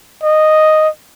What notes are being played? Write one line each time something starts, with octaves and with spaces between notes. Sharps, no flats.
D#5